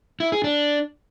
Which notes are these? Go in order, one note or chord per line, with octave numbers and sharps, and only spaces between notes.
E4
G#4
D4